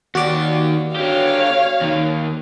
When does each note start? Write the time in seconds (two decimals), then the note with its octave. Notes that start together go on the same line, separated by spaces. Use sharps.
0.15 D#2 F#4 G4 D5
0.95 D3 G4 C#5 F5
1.81 D#2 D#3